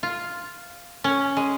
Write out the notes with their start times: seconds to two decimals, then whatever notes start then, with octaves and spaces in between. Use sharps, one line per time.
0.03 F4
1.04 C#4
1.37 G#3